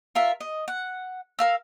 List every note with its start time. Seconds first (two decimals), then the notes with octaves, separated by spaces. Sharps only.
0.15 F4 A#4 E5
0.41 D#5
0.68 F#5
1.39 A#4 F5 E6